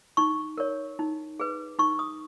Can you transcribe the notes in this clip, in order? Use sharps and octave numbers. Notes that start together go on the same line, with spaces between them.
D#4 C#6
A#4 C#5
D#4
G#4 B4
D#4 C#6
D#6